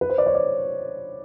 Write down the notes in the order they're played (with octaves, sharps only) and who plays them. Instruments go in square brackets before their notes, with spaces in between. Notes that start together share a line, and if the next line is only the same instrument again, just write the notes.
[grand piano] B4
C5
D5
C#5
D5